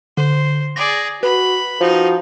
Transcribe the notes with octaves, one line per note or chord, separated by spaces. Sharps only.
D3 C5
G#4 D5 A#6
F#4 B4 B5
F3 D#4 F#4